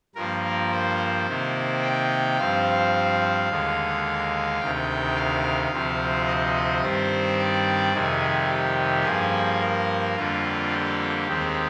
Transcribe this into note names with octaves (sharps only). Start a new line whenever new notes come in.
G2 F3 A#3 A#4
C5
C3 D#3 A#3
G5
G2 F3 C4 F5
D#2 D3 G#3
D2 C3 D#3 G5
F5
D2 C3 F3 C4
D#5
G2 D#3 G3 C4 C5
D5
F2 C3 D#3 G3 G#4
G4
G2 F3 A#3 G#4
A#4
F2 D3 G3 A#3 F4
G4
D#2 D#3 G#3 C4